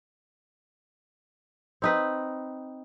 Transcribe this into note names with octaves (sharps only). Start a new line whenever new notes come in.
C4 D#4 B4